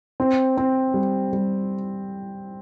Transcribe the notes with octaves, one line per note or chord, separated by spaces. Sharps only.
C4
C4
G3
G3